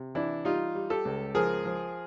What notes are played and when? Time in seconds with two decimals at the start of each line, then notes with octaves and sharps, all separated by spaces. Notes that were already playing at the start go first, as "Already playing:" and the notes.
Already playing: C3
0.15 E3 D4 E4
0.45 G3 D#4 F4
0.75 G3
0.90 G4 A4
1.05 C#2
1.35 F3 G#4 A#4
1.65 F3